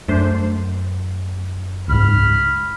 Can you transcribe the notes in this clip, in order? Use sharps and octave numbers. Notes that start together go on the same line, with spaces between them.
F#2 A3 D4 C5
C#2 G#2 B5 F6